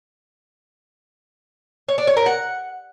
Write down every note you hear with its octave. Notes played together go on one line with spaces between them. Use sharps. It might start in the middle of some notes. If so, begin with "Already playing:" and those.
C#5
D4
C#5
A#4
F#5